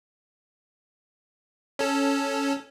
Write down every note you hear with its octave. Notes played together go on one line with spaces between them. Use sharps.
C#4 A4